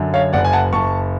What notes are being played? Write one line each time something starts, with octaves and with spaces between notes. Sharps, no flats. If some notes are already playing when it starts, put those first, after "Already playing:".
Already playing: F#2 D3
C#5 F5
F#1 D5 F#5
G#5
F#5 A5
F#1 A5 C#6